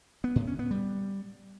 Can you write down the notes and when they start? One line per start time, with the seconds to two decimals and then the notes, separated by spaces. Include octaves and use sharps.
0.24 B3
0.36 A2
0.47 C#4
0.59 B3
0.71 G3